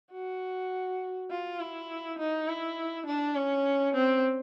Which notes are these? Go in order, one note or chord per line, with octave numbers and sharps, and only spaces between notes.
F#4
F4
E4
D#4
E4
D4
C#4
C4